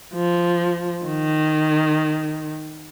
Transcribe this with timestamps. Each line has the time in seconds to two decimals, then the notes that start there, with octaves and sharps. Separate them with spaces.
0.14 F3
1.06 D#3